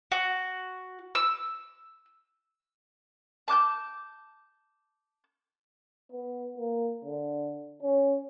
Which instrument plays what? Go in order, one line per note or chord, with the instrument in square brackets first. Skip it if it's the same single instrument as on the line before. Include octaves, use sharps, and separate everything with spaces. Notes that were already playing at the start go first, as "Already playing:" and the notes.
[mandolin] F#4
E6
A5 D6 F#6 G6
[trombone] B3
A#3
D3
C#4